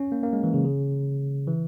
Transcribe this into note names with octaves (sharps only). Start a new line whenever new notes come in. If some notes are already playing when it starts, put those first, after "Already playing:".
Already playing: C#4
A#3
A#3
G#3
E3
C#3
C#3
E3